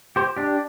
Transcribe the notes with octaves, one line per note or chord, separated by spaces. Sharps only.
G4 C5
D4 G4